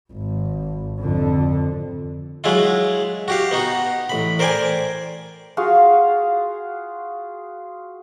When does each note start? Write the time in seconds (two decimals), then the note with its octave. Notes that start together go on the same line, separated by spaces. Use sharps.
0.12 G#1
1.00 F2 D3
2.44 F#3 G#3 E4 F4
3.28 F#4 G4 F5
3.51 B3 D#4 F#4
4.09 A1 B5
4.39 A#4 C5 D5 G5 G#5
5.57 F4 F#4 G#4 F5